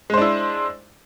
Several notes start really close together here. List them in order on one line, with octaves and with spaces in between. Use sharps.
G#3 C5 D4 E4